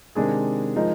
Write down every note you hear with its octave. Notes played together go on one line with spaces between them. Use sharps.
C3 D#3 G#3 D4 G#4
F3 G#3 D#4 A#4